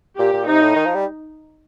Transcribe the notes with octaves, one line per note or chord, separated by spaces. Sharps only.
A#2 G4
A#2
C3 D#4
A2
D#3
F3
G3